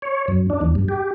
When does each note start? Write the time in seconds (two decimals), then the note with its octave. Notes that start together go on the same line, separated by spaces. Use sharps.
0.02 C#5
0.28 F#2
0.50 D4
0.61 E2
0.75 G2
0.88 G4